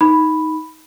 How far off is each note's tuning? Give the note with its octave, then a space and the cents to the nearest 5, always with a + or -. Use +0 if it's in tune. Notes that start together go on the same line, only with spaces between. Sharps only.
D#4 +10 B5 +0